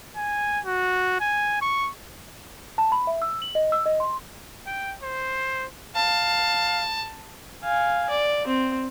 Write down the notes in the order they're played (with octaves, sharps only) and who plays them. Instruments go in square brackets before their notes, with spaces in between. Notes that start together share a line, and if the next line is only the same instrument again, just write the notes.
[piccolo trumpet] G#5
F#4
G#5
C#6
[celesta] A5
B5
E5
E6
F#7
D#5
E6
D#5
C6
[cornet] G5
C5
[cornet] F5 [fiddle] A5
[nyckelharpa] F5 G#5
D5
C4